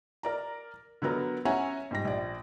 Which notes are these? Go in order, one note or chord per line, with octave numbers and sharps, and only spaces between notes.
A#4 D5 A#5
D3 F#3 B3 A#4
C#4 C#5 E5 F#5 G#5 A#5
G#2 G3 A#6
A#1 D5